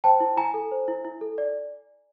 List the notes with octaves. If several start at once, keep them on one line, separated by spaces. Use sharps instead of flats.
C5 G5 A5
E4
E4 G#5 A#5
A4
C5
E4
E4
A4
D5